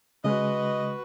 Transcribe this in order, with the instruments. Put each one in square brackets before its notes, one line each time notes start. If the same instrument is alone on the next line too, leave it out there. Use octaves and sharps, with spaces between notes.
[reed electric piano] C#3 G#3 [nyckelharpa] F#4 B4 [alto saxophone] D#5